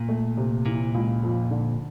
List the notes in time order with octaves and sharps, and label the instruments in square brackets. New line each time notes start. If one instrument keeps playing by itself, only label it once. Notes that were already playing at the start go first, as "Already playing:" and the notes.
Already playing: [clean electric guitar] A#2
[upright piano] A3
C3
[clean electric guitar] A#2 [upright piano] E3
[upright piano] C#2
F2
D3